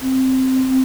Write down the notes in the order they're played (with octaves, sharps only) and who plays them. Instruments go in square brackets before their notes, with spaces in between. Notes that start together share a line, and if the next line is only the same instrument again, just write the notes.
[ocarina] C4